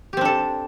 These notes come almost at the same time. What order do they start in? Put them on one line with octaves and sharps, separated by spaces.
G4 C4 D4 A4